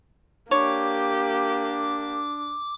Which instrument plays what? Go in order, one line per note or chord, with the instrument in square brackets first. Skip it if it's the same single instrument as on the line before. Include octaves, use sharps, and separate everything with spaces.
[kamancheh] A#3 G4 [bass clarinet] D4 [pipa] C#5 [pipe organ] D6